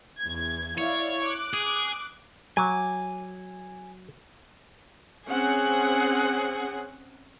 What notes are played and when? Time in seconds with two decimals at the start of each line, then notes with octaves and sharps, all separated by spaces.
0.21 E2 G#6
0.78 E4 C#5 D5 F5
1.24 D6 F#6
1.54 G#4
2.57 F#3 G#5 D6
5.29 C4 C#4 G#4 F#5